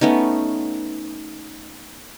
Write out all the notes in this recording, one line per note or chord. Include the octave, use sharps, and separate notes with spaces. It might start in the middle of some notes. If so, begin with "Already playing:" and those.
A3 B3 C#4 D#4